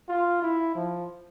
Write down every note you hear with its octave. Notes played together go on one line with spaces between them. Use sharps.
F4
E4
F3